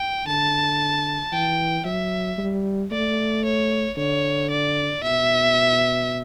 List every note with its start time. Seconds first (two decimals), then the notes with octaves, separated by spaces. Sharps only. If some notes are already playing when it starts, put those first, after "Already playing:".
Already playing: G5
0.26 D3 A5
1.32 E3 G5
1.85 F#3 E5
2.38 G3
2.91 A3 D5
3.45 C#5
3.97 D3 C#5
4.50 D5
5.03 B2 E5